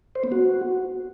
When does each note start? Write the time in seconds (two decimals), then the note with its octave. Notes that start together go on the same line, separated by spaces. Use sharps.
0.15 C5
0.24 B3
0.32 F#4